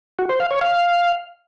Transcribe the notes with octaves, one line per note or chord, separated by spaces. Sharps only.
F#4
C5
F5
C#5
F5